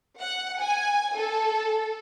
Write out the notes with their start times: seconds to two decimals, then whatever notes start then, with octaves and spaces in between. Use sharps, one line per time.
0.20 F#5
0.61 G#5
1.16 A4